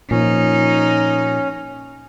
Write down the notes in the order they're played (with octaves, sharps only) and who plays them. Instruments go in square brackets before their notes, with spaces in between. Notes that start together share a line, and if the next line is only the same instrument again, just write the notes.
[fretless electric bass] A#2 F3 [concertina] C#4 [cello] D#4